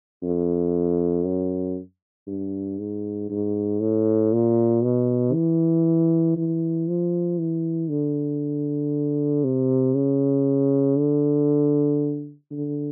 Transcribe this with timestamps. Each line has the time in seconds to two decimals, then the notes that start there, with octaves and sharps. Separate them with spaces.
0.23 F2
1.25 F#2
2.27 G2
2.79 G#2
3.30 G#2
3.80 A2
4.33 A#2
4.83 B2
5.34 E3
6.37 E3
6.88 F3
7.39 E3
7.90 D3
9.44 C3
9.94 C#3
10.97 D3
12.51 D3